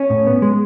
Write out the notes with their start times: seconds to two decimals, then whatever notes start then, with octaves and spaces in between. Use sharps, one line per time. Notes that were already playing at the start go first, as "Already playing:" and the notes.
Already playing: C#4
0.10 A2
0.27 B3
0.42 G#3